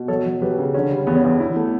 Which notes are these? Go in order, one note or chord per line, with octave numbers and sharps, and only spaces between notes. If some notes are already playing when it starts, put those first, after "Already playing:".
Already playing: B2
F#3 A4 C#5
F#3
F#3 G4 B4
C#3
D3 C#4
G3
E2 B3
C#4
E2
E4
A3